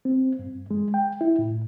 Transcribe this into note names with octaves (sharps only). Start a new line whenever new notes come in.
C4
G2
G#3
G5
E4
A2